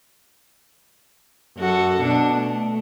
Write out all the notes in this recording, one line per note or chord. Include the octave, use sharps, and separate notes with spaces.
F#2 F#4 A4
B2 D4
A3